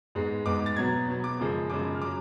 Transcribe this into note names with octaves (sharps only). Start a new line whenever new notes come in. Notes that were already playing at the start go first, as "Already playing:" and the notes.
G#2 G#3 B3
G#2 G#3 B3 D6
A6
B2 F#3 B3 G#6
B2 F#3 B3
D6
F#2 C#3 F3 G#3
F#2 C#3 F3 G#3 D6
F6
C#3 F#3 D6